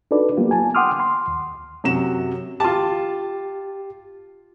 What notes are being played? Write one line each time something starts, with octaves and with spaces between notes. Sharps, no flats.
D4 D#4 F#4 A4 B4 D5
F#3 A#3 B3 F4 G4
G#5 A5
F#5 G5 C6 D6 D#6 F6
C6
D#2
F#2 C3 F#3 F#4 E7
F4 G4 A5